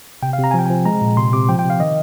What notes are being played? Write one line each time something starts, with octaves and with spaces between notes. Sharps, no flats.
C3 G5
F5
C3 A#5
G#5
F3 G5
F3 G#5
G#3 A#5
A#2
C3 C6
C3 D6
F3 G5
G5
C3
F5
D#3 D#5